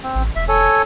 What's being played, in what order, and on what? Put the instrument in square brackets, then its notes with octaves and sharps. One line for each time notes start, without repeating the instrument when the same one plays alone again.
[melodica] C4
[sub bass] A1
[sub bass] E1 [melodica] E5
[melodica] A4 C#5 G#5